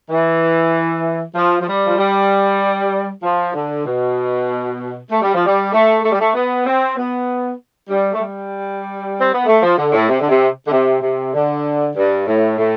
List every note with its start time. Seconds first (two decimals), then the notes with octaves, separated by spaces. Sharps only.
0.10 E3
1.34 F3
1.60 F3
1.66 G3
1.86 F3
1.97 G3
3.23 F3
3.53 D3
3.85 B2
5.10 A3
5.21 G3
5.33 F3
5.45 G3
5.72 A3
6.03 A3
6.12 G3
6.19 A3
6.34 B3
6.65 C4
6.96 B3
7.89 G3
8.12 A3
8.21 G3
9.19 C4
9.33 B3
9.46 A3
9.62 F3
9.77 D3
9.92 A2
10.08 C3
10.20 D3
10.28 C3
10.66 D3
10.71 C3
11.01 C3
11.33 D3
11.95 G2
12.26 A2
12.57 A2